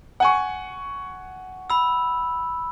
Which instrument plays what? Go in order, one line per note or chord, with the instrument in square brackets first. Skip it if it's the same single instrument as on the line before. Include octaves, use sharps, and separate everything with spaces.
[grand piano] F#5 G#5 C#6
[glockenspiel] B5 E6